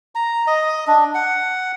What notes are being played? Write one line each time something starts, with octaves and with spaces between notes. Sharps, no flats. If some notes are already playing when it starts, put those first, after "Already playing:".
A#5
D#5
D4
F#5